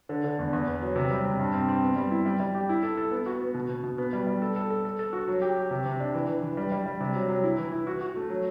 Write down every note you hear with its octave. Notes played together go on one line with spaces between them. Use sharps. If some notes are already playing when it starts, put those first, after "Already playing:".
D3
D3
E2
E2
B3
F#3
C3
G3
C3
G2
C4
C4
B3
G3
E4
G3
G3
G4
E4
A4
A4
B3
F#4
B3
B2
B2
B2
B3
G3
G3
A4
A4
A4
A4
A4
F#4
F#3
G4
G4
C3
C3
D4
E3
E3
E3
G3
G3
G3
C3
F#3
F#3
E4
E3
E4
F#4
F#4
A3
F#3